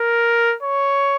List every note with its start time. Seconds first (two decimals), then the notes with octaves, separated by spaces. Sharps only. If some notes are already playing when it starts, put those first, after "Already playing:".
Already playing: A#4
0.63 C#5